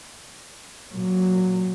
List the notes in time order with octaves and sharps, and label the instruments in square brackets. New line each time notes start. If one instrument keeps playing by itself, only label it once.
[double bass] A#2 F#3